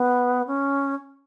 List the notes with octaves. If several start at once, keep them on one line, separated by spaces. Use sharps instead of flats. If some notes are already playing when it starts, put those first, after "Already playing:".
Already playing: B3
C#4